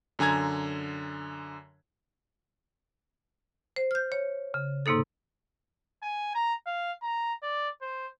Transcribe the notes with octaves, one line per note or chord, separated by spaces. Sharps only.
F#2 D3 G#5 A#5 G#6
C5
F6 G6
C#5
C#3
G#2 C3 A#3 D#4 A4
G#5
A#5
F5
A#5
D5
C5